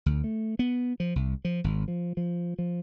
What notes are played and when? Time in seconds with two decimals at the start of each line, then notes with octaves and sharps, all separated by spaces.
0.06 D2
0.24 A3
0.59 B3
1.00 F3
1.16 C2
1.45 F3
1.64 G#1
1.88 F3
2.17 F3
2.59 F3